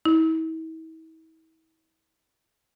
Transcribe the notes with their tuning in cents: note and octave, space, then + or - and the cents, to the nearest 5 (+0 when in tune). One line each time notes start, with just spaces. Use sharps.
E4 -40